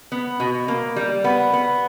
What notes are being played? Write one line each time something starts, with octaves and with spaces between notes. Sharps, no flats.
B3
B2
A#3
G3
B3
B3